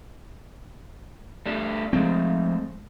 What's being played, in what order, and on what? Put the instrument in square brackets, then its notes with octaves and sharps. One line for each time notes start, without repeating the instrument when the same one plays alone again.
[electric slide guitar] A3 D4 G4
[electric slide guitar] F3 D#4 [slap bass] G#3 A3 C4